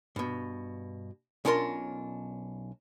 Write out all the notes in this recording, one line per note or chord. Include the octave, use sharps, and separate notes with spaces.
G2 B2
B1 C#4 D4 F4 A#4 C6